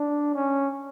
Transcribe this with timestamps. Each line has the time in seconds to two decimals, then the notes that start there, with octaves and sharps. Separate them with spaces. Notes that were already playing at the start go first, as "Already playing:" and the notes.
Already playing: D4
0.34 C#4